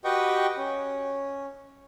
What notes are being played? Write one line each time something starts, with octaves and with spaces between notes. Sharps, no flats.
F#4 G4 B4 D#5 G5 C#6
C#4